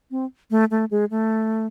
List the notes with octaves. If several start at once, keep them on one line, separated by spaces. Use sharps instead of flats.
C4
A3
A3
G#3
A3